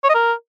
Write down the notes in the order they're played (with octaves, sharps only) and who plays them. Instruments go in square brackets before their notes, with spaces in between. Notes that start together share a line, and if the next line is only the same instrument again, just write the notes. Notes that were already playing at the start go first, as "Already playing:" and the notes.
[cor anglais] C#5
D#5
A#4